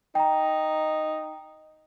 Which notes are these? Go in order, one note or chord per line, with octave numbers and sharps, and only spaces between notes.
D#4 G5 A#5